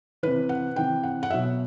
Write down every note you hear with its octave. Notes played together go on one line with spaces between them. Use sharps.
C3 E3 B4
F#5
C3 E3 G5
F#5
F#5
B2 F#3 E5